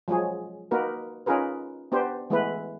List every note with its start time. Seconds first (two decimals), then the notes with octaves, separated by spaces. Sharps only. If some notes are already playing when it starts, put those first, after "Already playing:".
0.08 F3 F#3 G#3 G#4 C#5
0.71 A#3 D#4 F#4 A#4 B4
1.26 C#4 D#4 F4 G#4 A#4 B4
1.92 B3 D4 G4 C5
2.30 E3 G#3 A3 B3 E4 B4